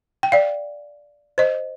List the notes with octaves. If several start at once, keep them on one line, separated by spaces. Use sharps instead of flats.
G5
D5 F5
C5 D#5